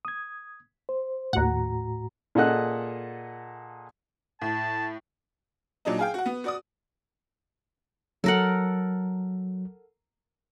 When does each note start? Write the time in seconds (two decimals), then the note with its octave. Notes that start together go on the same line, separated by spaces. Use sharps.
0.05 D#6 G#6
0.89 C5
1.33 D#2 A2 F#4 F#5 A#5
2.35 A#2 G#4 A4 D#5 F#5 F#6
4.42 A2 A5
5.85 A#2 F#3 D4 D#4
5.99 G#4 F5 G5
6.14 F#4 F#5
6.26 B3
6.44 F#4 D5 D#6
8.24 F#3 A4 A#4 F#5